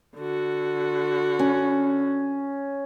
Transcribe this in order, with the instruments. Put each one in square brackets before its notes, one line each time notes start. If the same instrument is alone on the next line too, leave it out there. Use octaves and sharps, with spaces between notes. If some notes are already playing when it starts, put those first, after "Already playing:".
[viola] D3 F#4
[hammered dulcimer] C#4